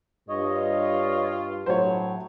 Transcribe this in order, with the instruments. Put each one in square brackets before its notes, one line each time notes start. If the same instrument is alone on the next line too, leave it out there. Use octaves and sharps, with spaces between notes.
[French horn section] G2 [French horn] F4 [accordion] C#5 D#5
[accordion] A2 F#3 [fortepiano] C5 C#5